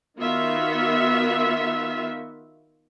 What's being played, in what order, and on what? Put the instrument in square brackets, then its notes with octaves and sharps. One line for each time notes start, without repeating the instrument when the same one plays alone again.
[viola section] D#3 B3 F4 F#4 E5